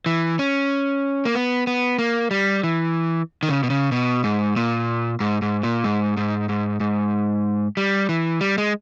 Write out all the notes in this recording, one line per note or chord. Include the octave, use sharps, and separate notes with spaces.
E3
C#4
A#3
B3
B3
A#3
G3
E3
D#3
C#3
B2
C#3
B2
G#2
A#2
G#2
G#2
A#2
G#2
G#2
G#2
G#2
G3
E3
G3
G#3